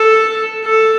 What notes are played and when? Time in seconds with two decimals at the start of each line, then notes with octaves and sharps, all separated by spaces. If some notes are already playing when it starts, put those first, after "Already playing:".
Already playing: A4
0.65 A4